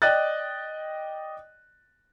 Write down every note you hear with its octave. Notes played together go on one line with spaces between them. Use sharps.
D5 D#5 G5 D#6 F#6 A6